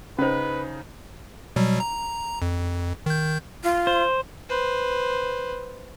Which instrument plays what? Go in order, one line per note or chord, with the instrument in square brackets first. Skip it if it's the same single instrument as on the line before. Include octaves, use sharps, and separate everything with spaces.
[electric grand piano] C#3 D#4 [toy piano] C#4 C5 [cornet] B4
[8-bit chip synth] B2 F#3 G3
A#5
F2
D#3 G6
[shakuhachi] F4
[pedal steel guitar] C5
[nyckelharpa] B4 C5